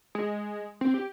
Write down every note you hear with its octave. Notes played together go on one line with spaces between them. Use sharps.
G#3
C4
G4